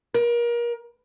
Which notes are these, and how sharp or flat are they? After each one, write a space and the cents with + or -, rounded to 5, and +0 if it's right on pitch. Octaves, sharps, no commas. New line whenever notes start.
A#4 +30